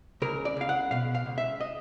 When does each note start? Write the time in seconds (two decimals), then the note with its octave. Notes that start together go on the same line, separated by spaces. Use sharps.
0.22 C#2 A#4
0.45 D5
0.57 C#2 F5
0.69 F#5
0.91 B2 F5
1.15 F5
1.26 C#2
1.38 E5
1.61 D#5